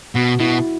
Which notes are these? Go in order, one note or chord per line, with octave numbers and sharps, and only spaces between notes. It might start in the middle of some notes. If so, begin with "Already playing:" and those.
B2 F#4
B2 E4